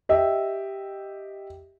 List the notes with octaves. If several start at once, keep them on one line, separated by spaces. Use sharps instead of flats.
G4 D#5 E5